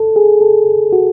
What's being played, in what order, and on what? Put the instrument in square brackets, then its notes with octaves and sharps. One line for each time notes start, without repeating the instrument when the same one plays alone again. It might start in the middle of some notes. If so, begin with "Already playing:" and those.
Already playing: [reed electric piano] A4
G#4
A4
F#4